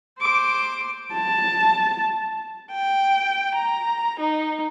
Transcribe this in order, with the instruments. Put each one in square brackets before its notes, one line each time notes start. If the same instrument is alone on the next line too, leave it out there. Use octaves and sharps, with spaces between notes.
[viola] C5 D6
[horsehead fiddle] A5
[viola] G5
A#5
D#4